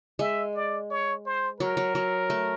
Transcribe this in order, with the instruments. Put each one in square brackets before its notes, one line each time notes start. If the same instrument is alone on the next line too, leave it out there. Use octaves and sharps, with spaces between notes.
[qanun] G#3 [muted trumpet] E5
[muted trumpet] D5
C#5
C5
[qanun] F#3 [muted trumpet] A#4
[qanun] F#3
F#3
A3